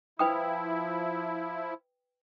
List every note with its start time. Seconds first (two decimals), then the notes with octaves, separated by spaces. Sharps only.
0.19 F3 E4 B4 G5 D#6